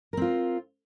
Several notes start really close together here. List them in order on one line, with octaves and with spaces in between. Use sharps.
A#4 C4 F4